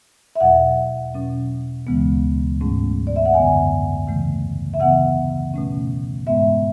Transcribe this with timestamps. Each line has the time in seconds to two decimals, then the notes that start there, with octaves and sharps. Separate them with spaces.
0.36 E5
0.40 E2 B2 F#3 F#5
1.14 B2 F#3 C#4
1.87 D2 C#3 E3 G#3 B3
2.60 G#2 F#3 A3 C#4
3.07 D5
3.16 E5
3.26 F#5
3.34 F#2 D3 F#3 B3 G#5
4.08 C#3 E3 A3
4.74 E5
4.80 C#3 E3 B3 F#5
5.54 B2 A3 C#4
6.26 G#2 G#3 B3 E5